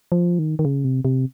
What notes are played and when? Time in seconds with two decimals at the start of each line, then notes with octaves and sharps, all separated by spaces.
0.12 F3
0.39 D#3
0.59 D#3
0.65 C#3
0.84 C3
1.05 C3